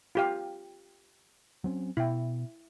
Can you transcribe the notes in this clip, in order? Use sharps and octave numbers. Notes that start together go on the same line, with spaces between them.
F4 G4 F5
F#3 C4 C#4
B2 E4 G5